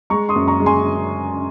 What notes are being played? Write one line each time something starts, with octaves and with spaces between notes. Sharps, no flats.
G#3 A#5 C#6
C6 D#6
F#2
A#5 C#6
G#3
G#5 C6